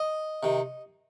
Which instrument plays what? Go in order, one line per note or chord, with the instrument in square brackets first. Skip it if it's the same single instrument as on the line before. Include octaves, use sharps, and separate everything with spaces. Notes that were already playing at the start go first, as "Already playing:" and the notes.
Already playing: [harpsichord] D#5
C3 D#3